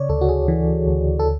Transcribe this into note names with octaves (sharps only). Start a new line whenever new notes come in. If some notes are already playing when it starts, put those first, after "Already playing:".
Already playing: C#3 C#5 D5
D2 A4
F#4
G#4
E3
D2
A4